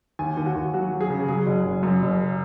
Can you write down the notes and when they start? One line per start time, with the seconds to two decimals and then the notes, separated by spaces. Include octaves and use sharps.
0.19 D#2 G#5
0.37 D#2
0.46 F#4
0.55 D#2
0.74 F#3 F#4
0.92 F#3
1.01 G#4
1.10 C#3
1.29 F#3 G#4
1.46 F#1
1.66 F#1
1.83 F#2
2.02 F#1